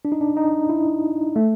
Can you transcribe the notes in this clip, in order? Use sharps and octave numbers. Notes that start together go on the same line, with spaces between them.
D4
D#4
D4
D#4
E4
A3